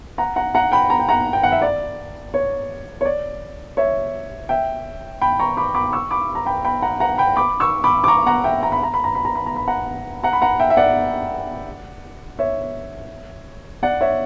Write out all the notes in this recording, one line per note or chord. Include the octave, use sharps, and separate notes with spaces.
F#5 A#5
F#5 A#5
F#5 A#5
G5 B5
A#5
G5
F#5 A#5
G5
F#5
E5
D5
C#5
C#5
D5
C#5 E5
E5 G5
G5 B5
A#5 C#6
B5 D6
B5 D6
C#6 E6
B5 D6
A#5
G5 B5
G5 B5
F#5 A#5
F#5 A#5
G5 B5
B5 D6
C#6 E6
B5 D6
D6
A#5 C#6
F#5 A#5
E5 G5
A#5
B5
A#5
B5
A#5
B5
A#5
B5
A#5
B5
F#5 A#5
F#5 A#5
B5
F#5 A#5
E5 G5
E5
D5 F#5
C#5 E5
D5 F#5
C#5 E5